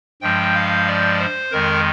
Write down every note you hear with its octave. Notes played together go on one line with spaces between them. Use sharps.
G2 F3 G#3 G5
F5
D5
C5
F2 D#3 G#3 A#4